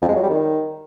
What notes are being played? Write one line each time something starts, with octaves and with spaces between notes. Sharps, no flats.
F2
G#3
F#3
G3
D#3